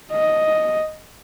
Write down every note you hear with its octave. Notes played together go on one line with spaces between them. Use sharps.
D#5